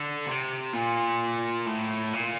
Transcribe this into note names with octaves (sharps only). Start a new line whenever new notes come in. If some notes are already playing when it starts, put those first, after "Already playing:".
Already playing: D3
C3
A#2
A2
A#2